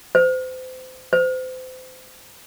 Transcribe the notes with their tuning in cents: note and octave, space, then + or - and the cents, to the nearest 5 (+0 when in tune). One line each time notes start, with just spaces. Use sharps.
C5 -30
C5 -30